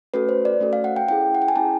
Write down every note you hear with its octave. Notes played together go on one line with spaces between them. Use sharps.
A3 C#4 F#4 A4 B4
C5
D5
A3 C#4 F#4 A4
F5
F#5
G5
C#4 E4 G#4 G5
F#5
G5
G#5
C#4 E4 G#4 A5